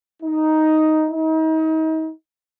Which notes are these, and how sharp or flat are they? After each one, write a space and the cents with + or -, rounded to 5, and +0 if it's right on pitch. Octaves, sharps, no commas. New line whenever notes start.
D#4 +5
D#4 +35